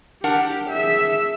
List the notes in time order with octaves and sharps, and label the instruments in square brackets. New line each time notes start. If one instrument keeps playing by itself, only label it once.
[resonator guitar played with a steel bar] D4 A#4 F#5 [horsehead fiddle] G4
[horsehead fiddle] G#4 E5